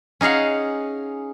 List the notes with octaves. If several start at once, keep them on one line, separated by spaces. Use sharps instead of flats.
C#4 D#4 G#4 F5 F#5